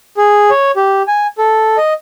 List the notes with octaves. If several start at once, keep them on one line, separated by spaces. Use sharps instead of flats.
G#4
C#5
G4
G#5
A4
D#5